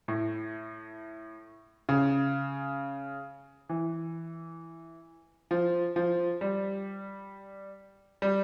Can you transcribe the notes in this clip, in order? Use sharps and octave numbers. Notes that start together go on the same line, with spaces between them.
A2
C#3
E3
F3
F3
G3
G3